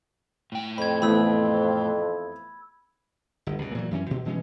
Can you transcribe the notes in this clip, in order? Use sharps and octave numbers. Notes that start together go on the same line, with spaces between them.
A2 G5
F2 B5 G#6
E3 A3 B3 B5 E6
G1
C#2 B2
A#2 E3 F#3
F#2 E3 C#4
B2
B2 E3 G#3 C#4